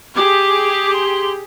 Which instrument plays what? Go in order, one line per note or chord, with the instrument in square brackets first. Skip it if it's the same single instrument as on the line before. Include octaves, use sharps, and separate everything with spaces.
[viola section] G4 G#4 [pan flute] D6
[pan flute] C6